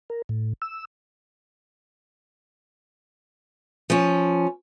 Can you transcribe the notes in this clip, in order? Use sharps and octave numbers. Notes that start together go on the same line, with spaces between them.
A#4
A2
E6
F3 C#4